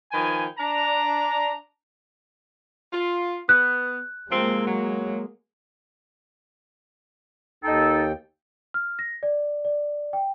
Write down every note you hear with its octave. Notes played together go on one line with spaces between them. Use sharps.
D#3 F3 B4 G5 G#5
D4 A#5
F4
B3 F#6
C3 F3 G#3 A#3 C4
F#3
D#2 D#4 A4 G5
F6
A#6
D5
D5
G5